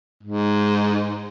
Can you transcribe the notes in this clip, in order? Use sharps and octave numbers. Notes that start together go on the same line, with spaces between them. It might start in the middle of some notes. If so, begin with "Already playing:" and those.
G#2